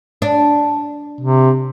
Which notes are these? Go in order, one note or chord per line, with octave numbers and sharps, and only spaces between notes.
D4
C3